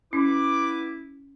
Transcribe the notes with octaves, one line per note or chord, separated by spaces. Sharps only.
B3 C#4 E4 B4 D6